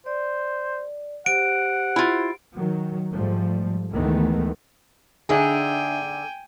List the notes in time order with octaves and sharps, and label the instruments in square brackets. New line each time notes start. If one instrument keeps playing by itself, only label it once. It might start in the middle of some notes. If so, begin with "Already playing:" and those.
[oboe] C5 [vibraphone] D5
[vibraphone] G4 C5 [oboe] F#5 [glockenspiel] D7
[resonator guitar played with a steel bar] E4 F4
[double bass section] D#3 F#3
G#2 F3 G3 A3
D2 D#3 E3 G#3 A3 B3
[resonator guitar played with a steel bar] D3 D#4 [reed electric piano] D4 E5 [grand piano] G#4 [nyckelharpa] G5 G#5